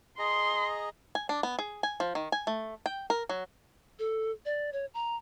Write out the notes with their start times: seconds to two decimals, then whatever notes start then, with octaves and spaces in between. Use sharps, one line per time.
0.19 G#4 D#5 A#5 C6
1.15 G#5
1.29 D4
1.43 B3
1.59 G#4
1.83 G#5
2.00 F3
2.15 D#3
2.32 G#5
2.47 A3
2.86 G5
3.10 A#4
3.29 F#3
3.99 A4
4.45 D5
4.73 C#5
4.94 A#5